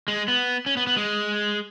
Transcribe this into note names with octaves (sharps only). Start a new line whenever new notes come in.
G#3
B3
C#4
B3
B3
G#3